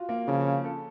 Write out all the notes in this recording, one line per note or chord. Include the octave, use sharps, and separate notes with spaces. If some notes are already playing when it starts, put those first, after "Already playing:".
Already playing: F4 F#4
A#3
C#3 F3
C#4
A4